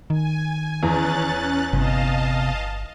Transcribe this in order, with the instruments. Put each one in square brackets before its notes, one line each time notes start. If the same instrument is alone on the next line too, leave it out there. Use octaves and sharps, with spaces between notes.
[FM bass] D#3 [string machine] G#5
[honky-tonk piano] E2 [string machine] C#4 F#6 A6
[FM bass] G1 [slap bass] C3 B3 [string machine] D#5 F5 A5